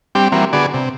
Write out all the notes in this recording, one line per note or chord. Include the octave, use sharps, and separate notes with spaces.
G3 C4 D4 G4
E3 G3 A#3 C4 F#4
D3 B3 F#4 G#4 D5
C3